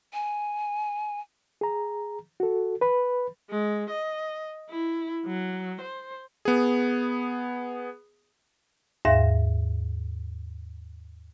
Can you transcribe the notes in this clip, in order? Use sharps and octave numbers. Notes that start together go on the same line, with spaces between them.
G#5
G#4 A#5
F#4 A4
B4 B5
G#3
D#5
E4
F#3
C5
B3 G#4
D#2 G#2 E5 F5 A#6